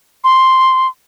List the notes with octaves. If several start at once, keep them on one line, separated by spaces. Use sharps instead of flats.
C6